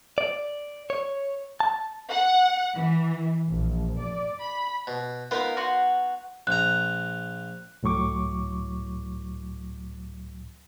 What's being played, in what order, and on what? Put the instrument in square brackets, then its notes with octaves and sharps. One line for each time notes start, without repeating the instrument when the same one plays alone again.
[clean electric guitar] D5
C#5
A5
[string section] F#5
E3
A#1
D5
B5
[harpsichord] B2
[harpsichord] B3 D#4 [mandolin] F4 A#4 B5
[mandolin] F#4 F#5 C6
[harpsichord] A#1 A#5 [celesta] F#6
[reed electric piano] C#2 A2 F#3 C#6 D6